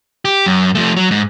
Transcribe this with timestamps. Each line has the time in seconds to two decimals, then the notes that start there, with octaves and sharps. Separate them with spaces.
0.25 G4
0.46 F#2
0.75 F3 A3
0.97 F#3
1.11 G#2